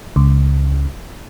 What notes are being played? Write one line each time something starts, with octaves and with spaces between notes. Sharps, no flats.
C#2